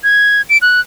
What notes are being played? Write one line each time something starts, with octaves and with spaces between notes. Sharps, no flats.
G#6
D7
F#6